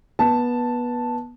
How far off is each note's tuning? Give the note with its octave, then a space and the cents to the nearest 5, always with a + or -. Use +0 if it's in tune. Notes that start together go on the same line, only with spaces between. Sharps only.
B3 -20 A5 +0